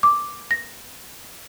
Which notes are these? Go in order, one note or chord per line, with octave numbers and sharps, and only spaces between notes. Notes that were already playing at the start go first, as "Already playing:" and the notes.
D6
A#6